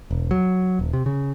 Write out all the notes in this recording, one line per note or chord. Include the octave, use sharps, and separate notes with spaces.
E1
F#3
D#1
C3
C#3